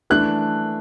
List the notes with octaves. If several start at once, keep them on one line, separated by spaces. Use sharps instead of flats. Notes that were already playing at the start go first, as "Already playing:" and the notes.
E3 A3 D4 F#6